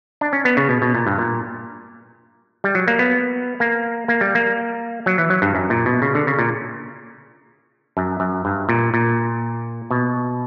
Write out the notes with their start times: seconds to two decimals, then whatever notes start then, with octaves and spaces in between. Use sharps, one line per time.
0.21 D4
0.33 C#4
0.45 B3
0.57 C#3
0.69 B2
0.82 B2
0.95 A#2
1.07 G2
1.18 A#2
2.64 G3
2.75 F#3
2.88 A#3
2.99 B3
3.60 A#3
4.08 A#3
4.21 G3
4.35 A#3
5.06 F#3
5.18 E3
5.30 F#3
5.42 G2
5.55 F#2
5.70 A#2
5.86 B2
6.02 C#3
6.15 D3
6.27 C#3
6.39 A#2
7.97 F#2
8.20 F#2
8.45 G2
8.69 A#2
8.94 A#2
9.91 B2